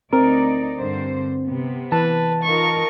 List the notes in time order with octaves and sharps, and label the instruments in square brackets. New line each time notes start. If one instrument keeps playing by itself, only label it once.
[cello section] D2 D#4 D5 [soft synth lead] C4 [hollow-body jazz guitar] A#4
[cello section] G2 D3 C5
C3 B3
[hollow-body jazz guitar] E3 [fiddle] B4 [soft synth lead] A5
[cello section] D#4 F4 A#4 [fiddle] C#6